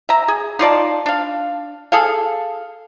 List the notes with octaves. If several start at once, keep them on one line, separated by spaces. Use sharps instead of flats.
E5 A#5
G#4
D#4 F4 D5 A5
D4 F5
G#4 A4 F5